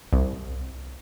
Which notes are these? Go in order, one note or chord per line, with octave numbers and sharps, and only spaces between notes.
C2